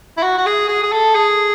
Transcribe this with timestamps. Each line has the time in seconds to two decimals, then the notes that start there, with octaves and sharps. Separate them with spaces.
0.17 E4
0.23 F#4
0.38 F#4
0.46 G#4
0.68 G#4
0.83 G#4
0.92 A4
1.15 G#4